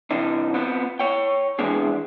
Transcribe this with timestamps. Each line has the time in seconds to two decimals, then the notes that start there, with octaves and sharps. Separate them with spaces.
0.11 C3 E3 D4 D#4
0.54 B3 C4 F4 B4
1.00 C#5 G5
1.59 E3 G#3 B3 C4 D4 G#4